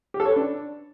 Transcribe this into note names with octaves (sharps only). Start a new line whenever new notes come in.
G4
A4
C#5
B4
D4